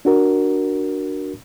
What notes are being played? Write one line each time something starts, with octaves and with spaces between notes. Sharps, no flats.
D4 F#4 A#4